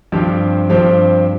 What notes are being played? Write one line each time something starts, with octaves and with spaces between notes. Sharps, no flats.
G2 F3 C4 G4
G2 F3 C4 G4